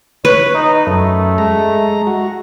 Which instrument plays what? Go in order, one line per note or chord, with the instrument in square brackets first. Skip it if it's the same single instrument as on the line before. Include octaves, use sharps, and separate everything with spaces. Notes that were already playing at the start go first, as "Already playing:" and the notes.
[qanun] B4 [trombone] C#5
[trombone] D#4
[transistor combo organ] F#2 [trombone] A3
[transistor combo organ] G#3 A#5
F#4